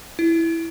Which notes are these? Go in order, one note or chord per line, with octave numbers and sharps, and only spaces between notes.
E4